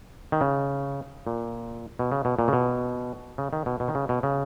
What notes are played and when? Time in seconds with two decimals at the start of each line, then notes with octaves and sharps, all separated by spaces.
0.32 D#3
0.41 C#3
1.27 A#2
1.99 B2
2.12 C#3
2.25 B2
2.39 A#2
2.48 C#3
2.53 B2
3.38 C#3
3.53 D#3
3.66 B2
3.80 B2
3.88 D#3
3.95 C#3
4.09 B2
4.23 C#3